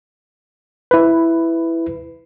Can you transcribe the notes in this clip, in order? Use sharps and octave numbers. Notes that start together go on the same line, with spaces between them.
E4 B4